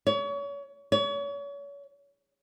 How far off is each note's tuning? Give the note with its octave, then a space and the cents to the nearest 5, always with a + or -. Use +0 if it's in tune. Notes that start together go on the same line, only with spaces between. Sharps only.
C#5 +30
C#5 +35